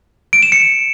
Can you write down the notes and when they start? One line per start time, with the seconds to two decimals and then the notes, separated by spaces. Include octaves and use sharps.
0.33 D7
0.43 E7
0.52 C#7